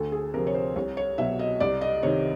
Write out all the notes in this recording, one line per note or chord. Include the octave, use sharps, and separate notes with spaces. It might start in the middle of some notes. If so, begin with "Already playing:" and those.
Already playing: D2 A4
G#4
C3 F3 A#4
C#5
C5
C2 C#5
C#5
B2 F#3 E5
D#5
C2 D5
D#5
C3 D#3 C#5